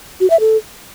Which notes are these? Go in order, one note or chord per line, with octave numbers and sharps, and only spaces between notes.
F#4
E5
A4